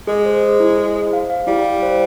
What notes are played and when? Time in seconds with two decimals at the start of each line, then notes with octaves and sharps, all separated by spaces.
0.07 G#3 G#4
0.26 C5
0.43 G#4
0.60 E4
0.78 G#4
0.95 C5
1.13 F5
1.30 F5
1.47 G3 E4
1.65 F5
1.82 C5